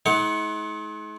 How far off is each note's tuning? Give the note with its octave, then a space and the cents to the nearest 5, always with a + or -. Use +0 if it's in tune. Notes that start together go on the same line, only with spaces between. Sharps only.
G#3 +45 D#4 +45 F#5 +0